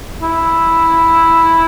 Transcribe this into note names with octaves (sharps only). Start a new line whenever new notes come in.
E4